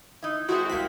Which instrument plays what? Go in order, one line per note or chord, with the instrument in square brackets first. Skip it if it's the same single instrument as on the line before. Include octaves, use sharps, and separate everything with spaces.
[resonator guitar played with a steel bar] D#4 E4
[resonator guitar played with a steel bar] G#3 A3 C4 [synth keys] E4 F#4
[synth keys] C2 B6 [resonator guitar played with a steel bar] A#3 C4